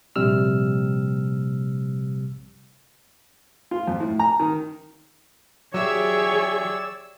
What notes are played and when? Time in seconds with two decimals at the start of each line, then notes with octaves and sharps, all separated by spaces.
0.16 A#1 C3 G3 E6 F6
3.71 F4
3.87 F2
4.00 A2
4.19 A#5
4.40 D#3
5.74 F#3 G4 G#4 C#5 D5 E5 E6